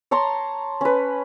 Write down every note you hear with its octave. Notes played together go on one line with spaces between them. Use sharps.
C#5 A5 A#5 C6
C#4 B4